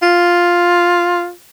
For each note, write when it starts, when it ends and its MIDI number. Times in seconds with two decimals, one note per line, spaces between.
0.03 1.31 65